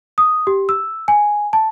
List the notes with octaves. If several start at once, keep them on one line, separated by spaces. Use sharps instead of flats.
D#6
G4
E6
G#5
A5